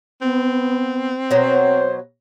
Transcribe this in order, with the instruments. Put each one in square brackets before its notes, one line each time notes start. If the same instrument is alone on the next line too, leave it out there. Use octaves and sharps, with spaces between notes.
[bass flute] B3 [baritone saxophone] C4
[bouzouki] B2 F#3 [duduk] C5 [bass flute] C#5